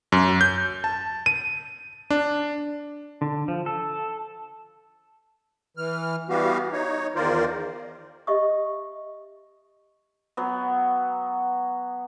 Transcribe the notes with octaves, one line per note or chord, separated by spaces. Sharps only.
F#2
G6
A5
D#7
D4
D3
F3
A4
E3 F6
E3 G3 B3 F#4 G4 F5
D#4 C#5
E2 D#3 F4 A#4 C5 D5
G4 D#5 E5 C#6 D#6
F#3 B3